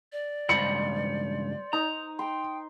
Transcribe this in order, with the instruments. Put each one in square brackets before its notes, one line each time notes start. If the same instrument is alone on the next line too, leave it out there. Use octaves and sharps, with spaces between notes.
[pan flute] D5
[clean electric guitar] C#2 G2 B5 [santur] C5 [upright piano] C#7
[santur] D#4 [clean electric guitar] A#5
[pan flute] G5 [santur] C6